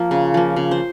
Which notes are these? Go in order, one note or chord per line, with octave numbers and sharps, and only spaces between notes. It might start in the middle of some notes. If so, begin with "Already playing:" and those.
Already playing: F3 A#3 A#4
C#3
F3 A#3
C#3
C5